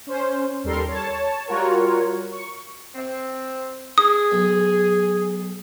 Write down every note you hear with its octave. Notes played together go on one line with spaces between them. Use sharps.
C#4 C5
D#2 G3 A4 A#4 C6
C#5 A5
G3 F4 F#4 A#4 C#5
C#6
C4
G#4 D#6
B1